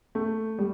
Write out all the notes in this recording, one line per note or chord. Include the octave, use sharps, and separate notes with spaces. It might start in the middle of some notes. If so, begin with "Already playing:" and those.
A3
G3